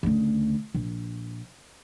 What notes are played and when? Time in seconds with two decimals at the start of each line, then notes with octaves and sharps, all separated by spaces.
0.03 D2 C#3
0.75 A#1